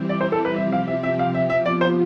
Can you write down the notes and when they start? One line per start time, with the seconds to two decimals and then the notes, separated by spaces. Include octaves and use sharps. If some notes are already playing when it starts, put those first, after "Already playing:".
Already playing: E3 G3 C4 E4 G4
0.09 D5
0.21 C5
0.32 A4
0.45 B4
0.56 C3 F3 C4 G4 E5
0.72 F5
0.88 E5
1.03 E5
1.19 F5
1.34 E5
1.50 F3 B3 F4 E5
1.66 D5
1.81 C5